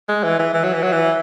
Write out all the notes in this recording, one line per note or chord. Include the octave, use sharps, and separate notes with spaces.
G#3
E3
E3
E3
F#3
E3
F#3
E3